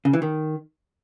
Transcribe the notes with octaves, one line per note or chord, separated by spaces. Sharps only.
C#3
E3
D#3